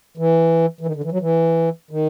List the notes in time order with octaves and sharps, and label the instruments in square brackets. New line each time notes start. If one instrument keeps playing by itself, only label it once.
[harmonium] E3
E3
D#3
D3
E3
F#3
E3
D#3